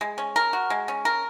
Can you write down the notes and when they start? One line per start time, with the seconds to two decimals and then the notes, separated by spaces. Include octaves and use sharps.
0.01 G#3
0.18 C#4
0.36 A#4
0.53 F#4
0.70 G#3
0.88 C#4
1.05 A#4